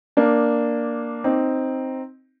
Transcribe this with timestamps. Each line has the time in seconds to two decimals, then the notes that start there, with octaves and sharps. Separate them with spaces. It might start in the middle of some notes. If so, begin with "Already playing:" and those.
0.17 A#3 D4
1.24 C4 D#4